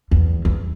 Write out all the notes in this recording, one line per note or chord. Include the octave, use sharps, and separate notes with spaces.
E2
E2